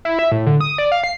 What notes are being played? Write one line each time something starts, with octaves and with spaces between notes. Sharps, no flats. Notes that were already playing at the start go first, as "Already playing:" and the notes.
E4
E5
A2
D3
D#6
D5
F5
C7